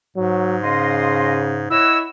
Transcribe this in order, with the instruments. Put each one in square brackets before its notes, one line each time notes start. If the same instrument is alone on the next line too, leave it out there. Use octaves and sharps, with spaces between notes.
[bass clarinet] G#2 [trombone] F#3
[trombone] C#3 [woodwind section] D#5 F5 C6
[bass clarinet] E4 [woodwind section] C#5 D#5 F#5 [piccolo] E6